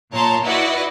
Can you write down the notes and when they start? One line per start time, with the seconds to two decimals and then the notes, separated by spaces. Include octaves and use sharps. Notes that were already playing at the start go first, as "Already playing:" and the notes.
0.12 A#2 C#5 A5 A#5 C6
0.43 E4 F#4 B4 D5 D#5